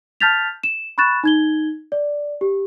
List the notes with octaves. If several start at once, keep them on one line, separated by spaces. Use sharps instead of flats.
A5 F6 G6 A6 B6 F7
E7
B5 C#6 F#6 A6 E7
D#4 G#6 G7
D5
G4